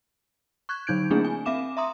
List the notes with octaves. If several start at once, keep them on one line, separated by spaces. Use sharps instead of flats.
C#6 F#6 G#6
D3 F#3 D#4 G6 G#6 D7
A3 A#3 C4 D4 E4 G#4
G#5
C4 E5 F5 D6 E7
E5 A#5 C6 D#6